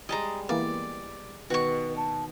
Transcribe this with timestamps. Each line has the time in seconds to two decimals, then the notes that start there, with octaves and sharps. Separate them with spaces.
0.09 G3 G#3 D#5 A5 A#5
0.49 E3 A#3 B3 D5
1.50 B2 D#3 F#4 B4 C#6
1.97 A5